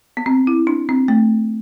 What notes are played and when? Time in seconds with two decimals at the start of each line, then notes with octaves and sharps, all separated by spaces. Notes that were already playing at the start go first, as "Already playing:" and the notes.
0.17 B3
0.26 C4
0.47 E4
0.67 D4
0.89 C4
1.08 A3